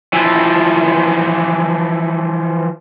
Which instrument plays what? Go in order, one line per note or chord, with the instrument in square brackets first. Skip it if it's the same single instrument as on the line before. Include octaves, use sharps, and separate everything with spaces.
[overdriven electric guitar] E3 F3